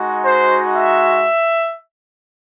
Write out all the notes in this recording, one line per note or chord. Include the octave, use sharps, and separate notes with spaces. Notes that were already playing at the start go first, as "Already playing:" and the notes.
Already playing: G#3 D#4 F#4
C5
E5